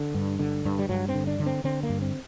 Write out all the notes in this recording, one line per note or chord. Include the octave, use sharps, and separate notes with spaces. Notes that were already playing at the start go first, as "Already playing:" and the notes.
Already playing: D3
G2
D3
G2
G3
G2 F#3
C4
D3
D4
D3
C4
D3 C4
A#3
G2
C4